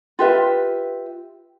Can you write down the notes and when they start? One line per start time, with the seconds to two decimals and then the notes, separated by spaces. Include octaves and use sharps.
0.19 F4 G4 B4 E5